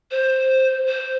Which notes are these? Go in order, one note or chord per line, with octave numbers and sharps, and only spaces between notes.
C5
C5